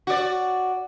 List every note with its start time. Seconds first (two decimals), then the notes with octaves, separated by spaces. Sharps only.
0.07 F#4 D5